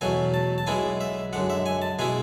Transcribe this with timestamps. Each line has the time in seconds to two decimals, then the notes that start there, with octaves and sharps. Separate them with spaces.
0.01 E2 B2 F#3 A3 G#5
0.34 A5
0.58 A5
0.67 B1 B2 G#3 B3 E4 G#5
1.01 E5
1.33 F#2 D3 G#3 F#5
1.50 E5
1.66 G#5
1.82 A5
1.99 B2 G#3 B3 E4 G#5